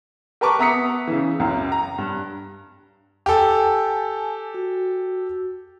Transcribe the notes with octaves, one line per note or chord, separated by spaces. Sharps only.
G4 A#4 B4 A5 C#6 D6
B3 E5 A#5 D#6 B6 C#7
C#3 E3
C#2 F#2
A#5
G2
G4 A4 G#5 A5
F#4